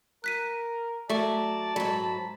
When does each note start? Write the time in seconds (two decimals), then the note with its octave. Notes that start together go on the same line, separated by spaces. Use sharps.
0.24 A#4 F#6 B6 D#7
1.10 F#3 A3 D5 E5 A5 C#6
1.76 G#2 F#3 B5